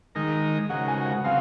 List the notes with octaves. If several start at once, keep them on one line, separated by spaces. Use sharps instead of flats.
D#3 G#3 D#4 A#4
C#3 G#3 D#4 F#4 A#4 F#5
G#5
F#5
C#3 F#3 C4 F4 F5